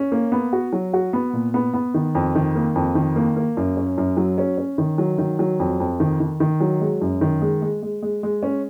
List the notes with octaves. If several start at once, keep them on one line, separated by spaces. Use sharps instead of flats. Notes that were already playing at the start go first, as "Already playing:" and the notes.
Already playing: C#4
A#3
B3
F#4
F#3
F#4
B3
A#2
B3
B3
D#3
F2
D#3
A#3
F2
D#3
A#3
A#3
F#2
C#4
F#2
F#3
C#4
C#4
D#3
F#3
D#3
F#3
F2
F2
D#3
D#3
D#3
F#3
G#3
F#2
D#3
G#3
G#3
G#3
G#3
G#3
C#4